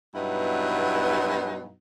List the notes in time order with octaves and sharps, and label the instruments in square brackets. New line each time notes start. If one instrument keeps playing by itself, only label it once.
[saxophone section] G2 B2 F#3 B3 D#4 E4